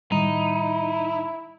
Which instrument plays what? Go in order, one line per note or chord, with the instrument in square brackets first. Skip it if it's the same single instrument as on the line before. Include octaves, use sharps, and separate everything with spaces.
[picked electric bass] A2 D#3 G3 [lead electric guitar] D#4 [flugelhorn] E4